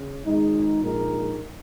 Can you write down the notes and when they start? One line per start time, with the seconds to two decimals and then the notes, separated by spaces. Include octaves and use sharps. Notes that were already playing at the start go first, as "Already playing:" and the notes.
Already playing: C#3
0.25 G#1 G#2 G#3 D#4
0.81 A#1 A#2 G#3 D#4 A#4